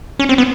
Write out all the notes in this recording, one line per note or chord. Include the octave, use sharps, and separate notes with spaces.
C#4
C4
B3